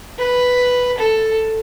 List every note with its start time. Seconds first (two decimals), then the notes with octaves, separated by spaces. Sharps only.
0.19 B4
0.98 A4